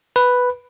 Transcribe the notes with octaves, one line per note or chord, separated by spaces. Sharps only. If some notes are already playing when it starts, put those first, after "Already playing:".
B4